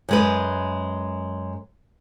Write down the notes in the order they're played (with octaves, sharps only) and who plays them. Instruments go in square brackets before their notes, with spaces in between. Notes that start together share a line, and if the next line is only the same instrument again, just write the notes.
[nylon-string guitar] F#2 G#3 B4